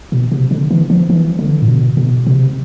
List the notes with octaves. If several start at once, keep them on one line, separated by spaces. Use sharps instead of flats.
B2
C3
D3
E3
F3
E3
D3
A2
B2
B2
C3